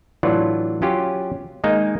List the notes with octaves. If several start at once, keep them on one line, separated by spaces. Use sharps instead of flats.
A2 E3 F#3 D4 F4 D5
F#3 C#4 F4 G4
D#3 G#3 A#3 D#4